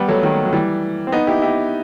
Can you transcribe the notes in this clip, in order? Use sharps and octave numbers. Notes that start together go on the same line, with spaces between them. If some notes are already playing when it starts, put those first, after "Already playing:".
Already playing: G3 B3
F#3 A3
D#3 F#3
F#3
E3 G3
C4
B3 D#4
E4 G4
E4 G4